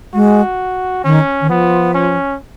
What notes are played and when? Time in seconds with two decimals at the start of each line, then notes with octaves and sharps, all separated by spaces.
0.14 G#3 F#4
1.04 D#3 C#4
1.41 D#3
1.49 F3 B3
1.94 C#4